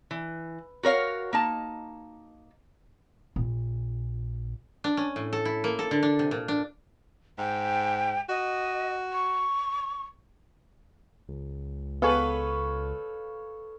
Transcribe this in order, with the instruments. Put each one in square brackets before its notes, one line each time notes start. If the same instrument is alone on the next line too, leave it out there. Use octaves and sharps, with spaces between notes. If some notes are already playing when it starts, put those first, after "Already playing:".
[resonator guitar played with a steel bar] E3
F#4 A#4 C#5 F5
A#3 D#4 A5
[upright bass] A#1
[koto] D4
C#4
A2
A4
E4
A#3
A4
D3
D4
C3
A#2
D4
[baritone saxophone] G#2 [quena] G5
[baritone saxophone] F#4 [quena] D#5
[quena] C#6
[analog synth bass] C#2
[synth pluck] B3 G#4 [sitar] A4 B4 [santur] C#5 F5